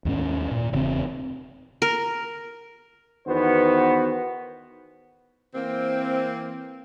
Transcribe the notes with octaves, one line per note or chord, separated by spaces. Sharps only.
D#2 G#2 C#4
A#2
E1 C#3 C4
A#4
E2 D#3 B3 F#4 C5
E3 A#3 C4